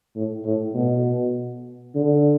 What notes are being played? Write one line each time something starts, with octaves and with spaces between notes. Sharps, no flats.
A2
A2
B2
D3